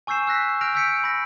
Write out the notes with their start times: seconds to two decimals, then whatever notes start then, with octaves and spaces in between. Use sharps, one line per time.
0.07 G#5 C#6 E6 G6 C7 E7
0.27 E6 F#6 A#6 B6
0.61 F6 G6 A#6 D7 F7
0.75 E6 F6 G6 B6 C#7 D7
1.04 B5 A#6